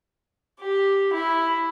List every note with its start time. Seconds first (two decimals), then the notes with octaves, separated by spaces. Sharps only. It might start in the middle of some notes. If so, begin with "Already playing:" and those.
0.61 G4
1.14 E4